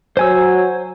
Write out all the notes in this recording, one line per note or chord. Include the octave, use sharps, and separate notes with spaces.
F#3 C5 G#5 E6